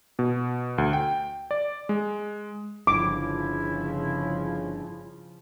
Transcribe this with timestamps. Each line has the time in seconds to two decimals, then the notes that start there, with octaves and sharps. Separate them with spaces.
0.19 B2
0.78 D2
0.93 G5
1.51 D5
1.89 G#3
2.87 G1 G2 C#3 F3 E4 D6